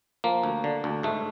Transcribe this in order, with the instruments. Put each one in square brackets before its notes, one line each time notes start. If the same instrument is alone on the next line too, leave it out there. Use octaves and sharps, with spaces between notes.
[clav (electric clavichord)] F3 A#3
D2
D3
D2
G#2 A3